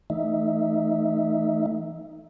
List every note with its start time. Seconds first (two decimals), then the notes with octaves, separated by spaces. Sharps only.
0.10 E3 A3 D#4 D#5 E5